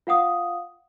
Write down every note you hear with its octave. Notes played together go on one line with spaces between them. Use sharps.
F4 F5 F#5 D#6